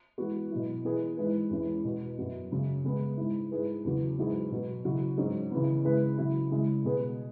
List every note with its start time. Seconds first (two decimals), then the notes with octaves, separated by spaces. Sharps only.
0.18 E3 G#3 B3 F#4
0.51 B2 F#3 E4
0.85 E3 B3 G#4 B4
1.17 G#2 E3 G#3 E4 B4
1.50 E2 E3 G#3 C#4 E4
1.84 B2 B3 F#4
2.18 F#2 F#3 B3
2.51 F#2 C#3 F#3
2.84 C#3 G#3 B3 G#4
3.17 G#2 G#3 E4
3.51 G#2 G#3 E4 G#4 B4
3.84 E2 C#3 F#3
4.18 G#2 F#3 E4 G#4
4.51 B2 F#3 B3
4.85 C#3 F#3 E4
5.17 G#2 F#3 C#4 G#4
5.51 C#3 E3 B3
5.85 C#3 G#3 E4 B4
6.18 C#3 F#3 E4
6.51 C#3 G#3 E4 G#4
6.84 B2 B3 G#4 B4